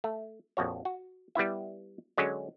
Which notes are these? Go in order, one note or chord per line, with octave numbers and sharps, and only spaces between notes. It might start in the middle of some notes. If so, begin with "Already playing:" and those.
A3
A#1 F2 F#4 C#5
F#4
G3 B3 E4 E5
D3 F#3 G#3 C#4